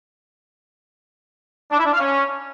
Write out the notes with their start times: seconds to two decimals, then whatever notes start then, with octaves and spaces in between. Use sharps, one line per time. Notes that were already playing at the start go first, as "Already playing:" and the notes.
1.72 D4
1.79 E4
1.86 D4
1.93 F5
2.00 C#4